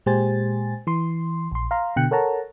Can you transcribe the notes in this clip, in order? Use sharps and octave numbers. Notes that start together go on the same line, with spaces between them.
A#2 G#3 G4 C5 G#5 A6
E3 C6
A#1 C6
F5 A#5 C6
B2 D3 G5 F#6 C#7
A4 A#4 C#5 F#5 A5 A#5